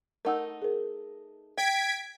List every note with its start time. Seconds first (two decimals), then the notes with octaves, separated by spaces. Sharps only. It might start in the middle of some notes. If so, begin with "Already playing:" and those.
0.25 A3 D#4 A#4 F#5 E6
0.62 G#4 A#4
1.58 G5 G#6 B6 D7